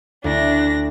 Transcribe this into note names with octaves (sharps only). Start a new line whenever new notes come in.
D2 D4 E4 A#6